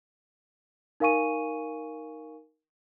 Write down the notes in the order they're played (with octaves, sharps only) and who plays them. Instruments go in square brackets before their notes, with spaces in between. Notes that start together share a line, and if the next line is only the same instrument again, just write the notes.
[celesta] D#4 A#4 F5 G#5 C#6 D#7